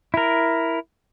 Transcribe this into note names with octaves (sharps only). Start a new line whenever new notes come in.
E4 A#4